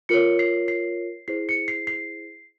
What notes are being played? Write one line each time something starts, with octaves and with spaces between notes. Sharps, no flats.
F4 A#4 C#5 C#7
C7
C7
E4 G#4 C5 C7
C#7
C7
C7